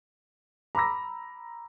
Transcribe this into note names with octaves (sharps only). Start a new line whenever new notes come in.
A#5 B5 D6 E6 A#6